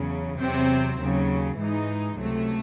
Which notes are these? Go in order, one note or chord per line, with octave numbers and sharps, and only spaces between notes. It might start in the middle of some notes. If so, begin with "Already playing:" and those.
Already playing: E2 C#3 F#3
E2 C3 F#3 C4
D#2 C#3 F#3
G#2 E3 G#3 D#4
C#2 C3 F#3 A3